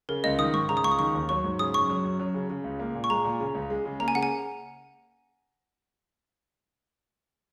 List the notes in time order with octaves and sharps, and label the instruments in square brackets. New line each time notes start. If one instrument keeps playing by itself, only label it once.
[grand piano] C#3 [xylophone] A#4
[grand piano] C#2 [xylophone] D#5
[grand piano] D#3 [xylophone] D#6
[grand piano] G#2 [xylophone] C#6
[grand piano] C#3 [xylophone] A#5
[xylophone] D#6
[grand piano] C#2 [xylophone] C#6
[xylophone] D#6
[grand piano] D#3 [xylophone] C#6
[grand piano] D#2
[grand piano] F#3 [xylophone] C#6
[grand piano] G#2
[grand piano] C#3 [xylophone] D#6
[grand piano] F#2 [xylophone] C#6
[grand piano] F#3
F#2
F#3
C#3
C#3
C#2
A#3
A#2
[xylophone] C#6
[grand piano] G#3 [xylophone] A#5
[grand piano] A#2
C#3
C#2
G#3
C#3
[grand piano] A#3 [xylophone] A#5
[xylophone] G#5
[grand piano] C#3 [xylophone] F#5
[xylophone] G#5